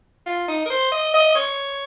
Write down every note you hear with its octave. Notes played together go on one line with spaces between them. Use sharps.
F4
D#4
A#4
C5
D#5
D#5
C#5